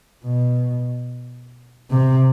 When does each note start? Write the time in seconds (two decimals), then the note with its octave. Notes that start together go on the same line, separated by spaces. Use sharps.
0.25 B2
1.91 C3